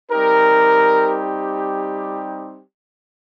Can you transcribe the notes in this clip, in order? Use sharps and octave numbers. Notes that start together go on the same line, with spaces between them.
G3 C4 D#4 G4 A#4